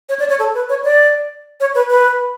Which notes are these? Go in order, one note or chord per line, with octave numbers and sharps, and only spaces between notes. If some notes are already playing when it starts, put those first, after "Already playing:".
C#5
D5
C#5
A4
B4
C#5
D5
C#5
B4
B4